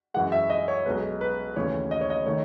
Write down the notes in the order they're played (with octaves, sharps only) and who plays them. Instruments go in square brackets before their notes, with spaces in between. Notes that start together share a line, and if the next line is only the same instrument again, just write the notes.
[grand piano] F#2 E3 G#3 F#5
E5
D#5
C#5
B1 B2 G#3 B4
B4
D#2 C#3 E3 A3 C#5
D#5
C#5
D#5
D#3 A3 C#5